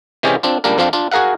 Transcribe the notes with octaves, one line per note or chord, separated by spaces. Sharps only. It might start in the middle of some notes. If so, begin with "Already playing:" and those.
C3 E3 G#3 C#4 G4 G#4
C4 D4 F4
C#2 G3 A#3 D4 A#4
F2 F3 C4 D4 F4 F5
D4 F4
F#4 G#4 A#4 F5 F#5